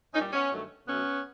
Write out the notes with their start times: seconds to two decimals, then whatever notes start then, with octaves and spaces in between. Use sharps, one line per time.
0.14 A#2 C#4 D#4
0.19 G3
0.33 B3 C#4
0.50 G2 D#3 F#3 A3
0.87 B2 F#3 A3 B3 C#4